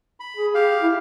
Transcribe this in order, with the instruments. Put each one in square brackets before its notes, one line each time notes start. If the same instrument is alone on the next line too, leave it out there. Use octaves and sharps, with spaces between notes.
[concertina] B5
[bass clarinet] G#4
[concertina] G4 F5
[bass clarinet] E4